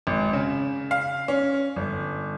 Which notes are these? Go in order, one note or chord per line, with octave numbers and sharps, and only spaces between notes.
G#1
C#3
F5
C#4
G1